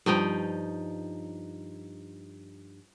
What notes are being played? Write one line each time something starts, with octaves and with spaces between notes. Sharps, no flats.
G2 F3 D#4 G5